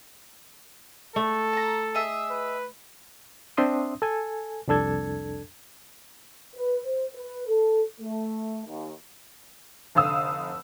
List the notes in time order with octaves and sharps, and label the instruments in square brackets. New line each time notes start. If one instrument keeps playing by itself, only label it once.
[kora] A3 [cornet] A4
[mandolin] A5 A#5
G#4 D#5 E5
[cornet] B4
[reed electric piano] C4 D4 E5 C6 D#6
A4 G#5
C2 F2 D4 A4 G#6
[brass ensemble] B4
C5
B4
A4
A3
D#2
[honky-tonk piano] F1 D3 F5 D#6 E6